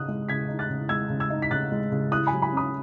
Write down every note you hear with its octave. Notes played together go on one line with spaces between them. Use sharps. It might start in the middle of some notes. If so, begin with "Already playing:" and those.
Already playing: C#3 D#4 D#6 F#6
G#3
C#3 G#6 B6
D#4
F#6 A6
C#3
G#3 E6 G#6
C#3
E6 G#6
D#4
B6
C#3 F#6 A6
G#3
C#3
E4 D#6 F#6
F#3 G#5 B5
G#5 B5
C#4 B5 D#6